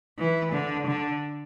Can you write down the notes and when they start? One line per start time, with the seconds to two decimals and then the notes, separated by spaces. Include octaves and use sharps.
0.19 E3
0.52 D3
0.87 D3